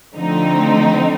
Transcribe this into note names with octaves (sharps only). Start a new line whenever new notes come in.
D3 F3 A3 C4 D#4